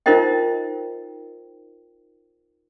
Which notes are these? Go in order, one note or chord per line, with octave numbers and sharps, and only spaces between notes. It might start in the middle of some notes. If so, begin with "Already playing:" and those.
D#4 F4 A#4 C5 D#5 G5